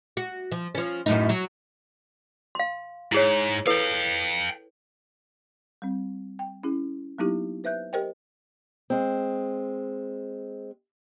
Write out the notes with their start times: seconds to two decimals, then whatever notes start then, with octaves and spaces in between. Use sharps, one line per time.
0.17 F#4
0.52 F3
0.75 F3 C#4
1.06 F#2 A2 D#4
1.29 F#3
2.55 F5 C6
3.12 G#2 E4 G#4 C#5
3.67 E4 A4 B4 F5 G5
5.82 G3 C4
6.39 G5
6.63 C#4 E4 G#4
7.18 F#3 A#3 B3 D#4 E4 G4
7.64 B4 C5 E5 F#6 G6
7.93 G4 A#4 C5 D#5 G5
8.90 G#3 C4